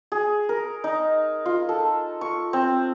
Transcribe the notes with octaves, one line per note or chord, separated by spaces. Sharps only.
G#4
A#4
D#4
F4
A4
C#6
C4